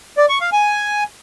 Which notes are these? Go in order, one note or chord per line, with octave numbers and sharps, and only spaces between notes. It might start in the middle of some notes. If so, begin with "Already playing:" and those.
D5
C#6
F5
G#5